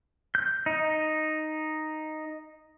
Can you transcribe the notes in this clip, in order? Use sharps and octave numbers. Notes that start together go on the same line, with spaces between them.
G6
D#4